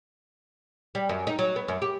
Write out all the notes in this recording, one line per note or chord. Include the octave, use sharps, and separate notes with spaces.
G3
F#2
D#4
F#3
B3
F#2
G4